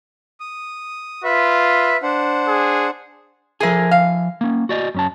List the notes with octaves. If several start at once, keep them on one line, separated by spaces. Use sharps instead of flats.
D#6
F4 B4 E5
D4 C5 F#5
G#4
F3 G#4 A#4 E5 G#5
F5
A#3 C#4
F#4 D5 D#5
F#2 C#4 A5